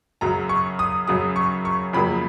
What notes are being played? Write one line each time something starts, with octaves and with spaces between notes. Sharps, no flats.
F#2 C#3 F#3 A#5
C#6
D#6
F#2 C#3 F#3 D#6
C#6
C#6
F2 C#3 F#3 A#3 B5